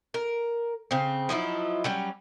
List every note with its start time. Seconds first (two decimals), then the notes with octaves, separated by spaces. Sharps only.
0.14 A#4
0.91 C#3 C4
1.29 F3 F#3 D#4 E4
1.84 F#3 G3 C#4